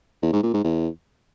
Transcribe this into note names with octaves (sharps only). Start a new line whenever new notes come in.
E2
G#2
A#2
G#2
E2